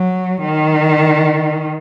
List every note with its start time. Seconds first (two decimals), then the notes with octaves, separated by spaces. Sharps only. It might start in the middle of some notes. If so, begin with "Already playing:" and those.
Already playing: F#3
0.45 D#3